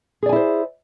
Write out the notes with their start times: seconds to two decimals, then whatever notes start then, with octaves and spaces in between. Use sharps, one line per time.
0.23 G#4
0.26 D5
0.29 G#5
0.33 E4
0.36 C5